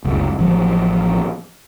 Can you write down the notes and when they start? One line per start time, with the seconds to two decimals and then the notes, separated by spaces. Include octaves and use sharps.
0.04 F1 C#2 F#2
0.39 A1 F3 F#3